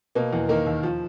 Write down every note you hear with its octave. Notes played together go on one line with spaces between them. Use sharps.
B2 A#3 A#4
E2
D#3 A#3 A#4
D#2
F3